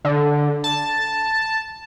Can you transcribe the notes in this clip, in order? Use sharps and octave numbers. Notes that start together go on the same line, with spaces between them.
D3
A5